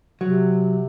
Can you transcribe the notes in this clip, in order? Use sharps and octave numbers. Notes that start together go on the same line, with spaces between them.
C3 F#3